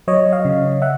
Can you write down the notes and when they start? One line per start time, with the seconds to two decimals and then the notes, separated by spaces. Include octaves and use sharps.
0.08 F#3 C#5 D#5
0.32 D#5 F5
0.45 C#3
0.82 E5 F#5